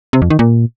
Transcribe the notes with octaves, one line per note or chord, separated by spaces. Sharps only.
C3
F2
D#3
A#2